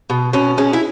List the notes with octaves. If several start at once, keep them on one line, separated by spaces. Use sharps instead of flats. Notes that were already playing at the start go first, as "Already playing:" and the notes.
B2
B2 C#4
G#3 C#4
E4